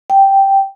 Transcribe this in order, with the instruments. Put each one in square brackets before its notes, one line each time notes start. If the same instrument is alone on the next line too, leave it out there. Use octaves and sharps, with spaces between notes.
[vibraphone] G5